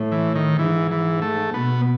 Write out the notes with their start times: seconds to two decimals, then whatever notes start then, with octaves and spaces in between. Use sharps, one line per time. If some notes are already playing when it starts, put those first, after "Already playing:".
Already playing: A2
0.12 E3
0.36 D#3
0.59 G#2 E3
0.91 E3
1.22 A3
1.54 B2 B3